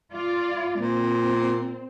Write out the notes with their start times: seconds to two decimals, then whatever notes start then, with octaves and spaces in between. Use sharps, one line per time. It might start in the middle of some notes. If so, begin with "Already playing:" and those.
0.12 F4 D5
0.80 A#2 C4